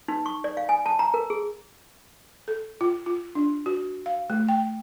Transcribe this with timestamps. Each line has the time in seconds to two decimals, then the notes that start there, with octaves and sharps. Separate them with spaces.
0.08 D#4
0.26 C#6
0.44 D5
0.57 F5
0.69 G#5
0.86 A5
0.99 A#5
1.14 A#4
1.30 G#4
2.48 A4
2.81 F4
3.06 F4
3.35 D4
3.66 F#4
4.06 F5
4.30 A3
4.48 G5